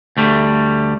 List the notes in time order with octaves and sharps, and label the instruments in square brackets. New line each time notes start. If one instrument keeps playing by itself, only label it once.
[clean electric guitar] D2 G3 A3